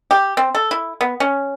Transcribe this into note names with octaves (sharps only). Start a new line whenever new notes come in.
G4
C4
A4
E4
B3
C#4